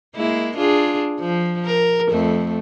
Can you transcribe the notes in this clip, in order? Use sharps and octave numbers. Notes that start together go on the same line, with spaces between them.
G#3 A#3 E4
D4 F4 G#4
F3
A#4
F2 A3